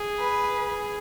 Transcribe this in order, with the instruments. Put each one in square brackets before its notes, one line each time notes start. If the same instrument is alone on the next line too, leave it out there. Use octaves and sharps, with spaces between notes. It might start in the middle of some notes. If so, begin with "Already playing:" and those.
Already playing: [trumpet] G#4
[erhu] B4